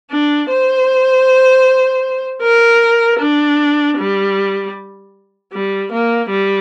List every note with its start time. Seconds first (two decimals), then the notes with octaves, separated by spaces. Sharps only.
0.11 D4
0.50 C5
2.44 A#4
3.20 D4
3.98 G3
5.53 G3
5.91 A#3
6.31 G3